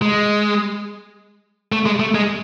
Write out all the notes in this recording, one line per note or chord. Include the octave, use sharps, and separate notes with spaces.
G#3
A3
G#3
A3
G#3